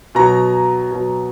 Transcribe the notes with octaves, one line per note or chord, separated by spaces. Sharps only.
B2 F#3 A#5
B2 F#3